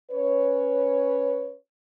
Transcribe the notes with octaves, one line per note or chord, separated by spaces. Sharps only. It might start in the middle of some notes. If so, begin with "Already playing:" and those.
C#4 B4 C#5